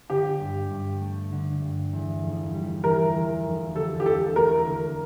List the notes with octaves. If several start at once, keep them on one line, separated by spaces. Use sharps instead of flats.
D3 G4
G2
G2
A3
D3
G2
E2
F1
G3
E3 A#4
E2
F1
D2 A4
G4
E1 A4
A3 A#4
D3